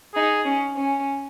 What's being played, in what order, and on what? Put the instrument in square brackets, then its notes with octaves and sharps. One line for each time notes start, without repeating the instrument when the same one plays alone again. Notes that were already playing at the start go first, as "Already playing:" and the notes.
[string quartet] D#4 [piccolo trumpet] G#4
[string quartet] C#4
C#4